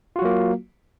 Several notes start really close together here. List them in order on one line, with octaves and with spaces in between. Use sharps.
F4 F#4 F#3 A#3